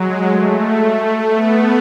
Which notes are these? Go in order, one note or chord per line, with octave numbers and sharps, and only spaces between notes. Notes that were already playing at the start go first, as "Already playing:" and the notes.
Already playing: F#3 G#3
A3
B3